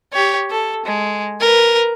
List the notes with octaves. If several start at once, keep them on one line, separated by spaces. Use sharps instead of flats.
G4 C#5
A4
G#3
A#4 B4